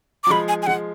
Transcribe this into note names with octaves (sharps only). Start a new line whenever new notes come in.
D6
F#3
F3 G#3 B5
G#5
G#5
F3 G#3 F#5